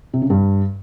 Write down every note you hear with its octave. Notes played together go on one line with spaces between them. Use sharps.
C3
C#3
G2